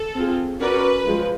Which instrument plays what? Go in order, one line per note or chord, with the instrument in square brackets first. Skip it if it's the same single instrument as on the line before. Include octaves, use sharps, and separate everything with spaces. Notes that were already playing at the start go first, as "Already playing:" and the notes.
Already playing: [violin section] A4
[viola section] C4 F4 G#4
[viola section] C#4 F#4 A#4 D5 [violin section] B4
[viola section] F3 G#3